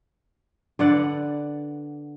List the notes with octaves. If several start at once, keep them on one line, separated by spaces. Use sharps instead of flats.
D3 B3 D5 F#5